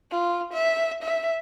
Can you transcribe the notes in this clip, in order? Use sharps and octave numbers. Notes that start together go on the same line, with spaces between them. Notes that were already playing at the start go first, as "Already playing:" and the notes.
F4
E5
E5